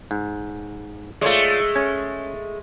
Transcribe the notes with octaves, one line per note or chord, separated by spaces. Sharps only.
G#2
G#3 A3 F4 C#5 D5
C#4